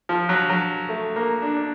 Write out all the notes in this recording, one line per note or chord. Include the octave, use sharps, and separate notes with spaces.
F3
F#3
F#3
A3
A#3
D4
D4